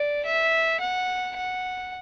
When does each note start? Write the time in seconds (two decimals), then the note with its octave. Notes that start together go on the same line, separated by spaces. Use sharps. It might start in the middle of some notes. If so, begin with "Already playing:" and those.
Already playing: D5
0.25 E5
0.80 F#5
1.36 F#5